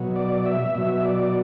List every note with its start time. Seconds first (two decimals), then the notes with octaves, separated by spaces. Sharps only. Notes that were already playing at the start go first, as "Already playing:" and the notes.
Already playing: B2 F#3
0.16 D5
0.46 E5
0.75 B2 F#3 E5
1.05 D5